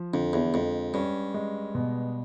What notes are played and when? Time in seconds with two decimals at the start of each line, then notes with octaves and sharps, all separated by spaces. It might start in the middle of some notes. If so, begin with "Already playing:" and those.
Already playing: F3
0.13 F2 D3
0.33 E2
0.54 F2 G#3
0.94 G2 C#4
1.34 G#3
1.75 B2